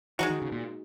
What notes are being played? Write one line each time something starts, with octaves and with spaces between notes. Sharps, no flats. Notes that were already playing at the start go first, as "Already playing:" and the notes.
E3 G#3 D#4 F#4
D#3
C#3
A#2